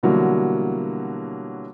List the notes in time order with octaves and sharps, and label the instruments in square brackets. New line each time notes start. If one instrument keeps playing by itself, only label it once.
[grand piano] B2 D3 E3 F#3 G3 A#3